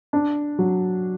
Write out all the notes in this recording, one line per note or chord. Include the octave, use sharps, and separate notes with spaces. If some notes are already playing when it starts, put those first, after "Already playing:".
D4
F#3